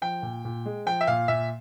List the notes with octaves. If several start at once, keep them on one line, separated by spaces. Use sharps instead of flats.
F3 G5
A#2
A#2
G#3
F3 G5
E5
A#2 F5
A#2 E5